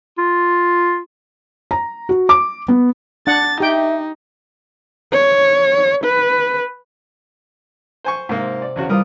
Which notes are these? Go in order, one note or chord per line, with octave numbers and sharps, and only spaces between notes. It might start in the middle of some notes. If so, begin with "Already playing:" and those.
F4
A#5
F#4
D6
B3
D4 F#5 A6
D#4 G4 E5 G5
C#5
B4
C5 G#5 C#6
G#2 C3 A#3
D5
E2 C#3 F#4
E3 G3 F4 A#4 D#6